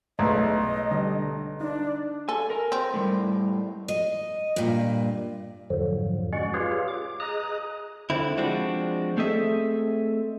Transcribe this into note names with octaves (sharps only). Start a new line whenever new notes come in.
B1 G#3 A3 B4 D#5
D3 G3 D4
D4 D#4
A4 G#5
A#4
C4
A2 G3
D#5
G2 A#2
F2 G#2 D3 F3 F#3
G#3 C#4 F#4 D5 F#5
F4 G4 G#4 B4 C#5 F5
D6
G#4 D#5 A#5 D#6 F#6
D3 C4 E4
F3 G#3 C4 D4 F#4
A3 C4 G#4 A4 D#5 E5